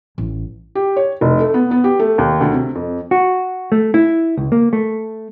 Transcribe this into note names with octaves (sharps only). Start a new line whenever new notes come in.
A1
G4
C#5
F1
A3
B3
B3
G4
A3
D#2
D2
C3
F2
F#4
A3
E4
C#2
A#3
A3